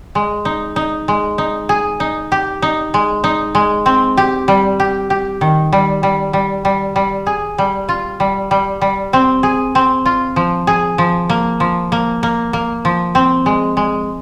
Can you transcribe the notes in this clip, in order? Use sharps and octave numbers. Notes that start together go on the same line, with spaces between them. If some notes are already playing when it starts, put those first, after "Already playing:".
G#3
D#4
D#4
G#3
D#4
G#4
D#4
G4
D#4
G#3
D#4
G#3
C4
G4
G3
G4
G4
D#3
G3
G3
G3
G3
G3
G#4
G3
F4
G3
G3
G3
C4
G#4
C4
F4
F3
G#4
F3
A#3
F3
A#3
A#3
A#3
F3
C4
G#3
G#3